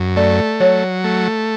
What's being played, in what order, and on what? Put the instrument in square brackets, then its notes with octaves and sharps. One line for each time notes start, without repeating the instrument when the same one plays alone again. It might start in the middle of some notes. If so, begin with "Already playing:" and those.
Already playing: [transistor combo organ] F#2
[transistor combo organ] A3 [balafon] D5
[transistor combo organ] F#3 [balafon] C#5
[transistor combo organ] A3